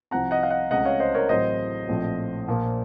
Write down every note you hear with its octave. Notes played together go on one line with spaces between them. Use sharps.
C2 C3 F3 C4 F#5 A#5
D#5 F#5
F5
D#5 F#5
C#2 C#3 A3 C4 D#5 F#5
C#5 F5
C5 D#5
A#4 C#5
A1 A2 F#3 C4 C5 D#5
A#1 A2 F3 A3 C4
A#1 A#2 F3 A#3